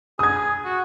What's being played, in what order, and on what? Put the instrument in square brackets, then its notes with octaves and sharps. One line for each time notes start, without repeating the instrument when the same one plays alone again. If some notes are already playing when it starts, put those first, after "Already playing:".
[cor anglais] G#4 [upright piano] D#6 G#6
[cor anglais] F#4